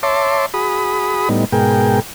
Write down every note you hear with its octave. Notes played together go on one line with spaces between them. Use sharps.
C#5 E5 A5 C6 D6
F#4 G#4 B5 D#6
A2 G3 B3 D#4
G#2 B2 G#4 A#4 G5